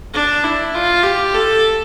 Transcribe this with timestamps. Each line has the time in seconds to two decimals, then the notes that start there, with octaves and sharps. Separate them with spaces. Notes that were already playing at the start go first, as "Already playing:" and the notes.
0.14 D4
0.44 E4
0.74 F4
1.03 G4
1.34 A4